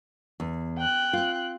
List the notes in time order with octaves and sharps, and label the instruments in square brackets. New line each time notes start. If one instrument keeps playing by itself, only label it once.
[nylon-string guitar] E2
[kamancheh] G5 F#6
[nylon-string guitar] C4 F4